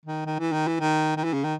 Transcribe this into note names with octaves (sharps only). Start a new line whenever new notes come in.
D#3
D#3
E3
D#3
E3
D#3
D#3
E3
C#3
D#3